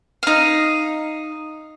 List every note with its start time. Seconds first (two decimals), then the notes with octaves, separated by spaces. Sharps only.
0.23 D#4 F5